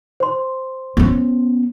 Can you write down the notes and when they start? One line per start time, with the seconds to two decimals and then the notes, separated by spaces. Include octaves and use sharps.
0.20 C5 C6
0.97 B3 C#4